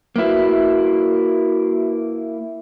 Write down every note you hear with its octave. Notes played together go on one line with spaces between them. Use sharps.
A#3 E4 F#4 B4